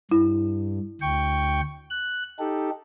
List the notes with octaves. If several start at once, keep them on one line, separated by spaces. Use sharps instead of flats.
G2 E4
D2 G5 C#6
F#6
D#4 G4 A4